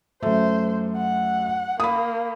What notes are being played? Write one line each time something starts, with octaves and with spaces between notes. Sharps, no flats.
F#2 A3 C5
F#5
A#3 B5 D#6